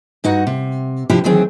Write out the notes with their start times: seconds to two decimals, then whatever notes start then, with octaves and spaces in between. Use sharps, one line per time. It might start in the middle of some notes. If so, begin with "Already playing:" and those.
0.24 G2 D#4 F#4 F#5
0.47 C3
1.10 C3 F3 D4 E4 F4 G4
1.24 D2 D#3 E3 F#3 C4 G#4